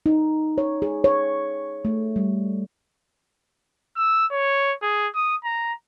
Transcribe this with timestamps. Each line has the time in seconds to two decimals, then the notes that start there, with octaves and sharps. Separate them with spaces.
0.06 D#4
0.58 C#5
0.82 G#4
1.04 C#5
1.85 A3
2.16 G3
3.96 E6
4.31 C#5
4.82 G#4
5.15 D#6
5.45 A#5